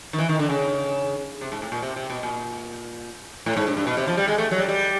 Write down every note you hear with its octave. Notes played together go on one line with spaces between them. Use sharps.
D#3
E3
D#3
D3
C#3
C3
G#2
A2
A#2
C3
C3
B2
A#2
A2
G#2
G2
G2
B2
C3
F3
G3
G#3
A3
F#3
G3
G3